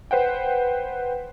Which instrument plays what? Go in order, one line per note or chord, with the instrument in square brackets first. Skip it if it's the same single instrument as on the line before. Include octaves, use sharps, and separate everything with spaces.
[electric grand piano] B4 C5 F#5 G5